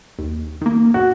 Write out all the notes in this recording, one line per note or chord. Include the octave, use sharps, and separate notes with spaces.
D#2
D#3 A#3
F#4